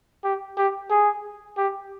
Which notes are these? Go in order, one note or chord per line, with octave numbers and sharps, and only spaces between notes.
G4
G4
G#4
G4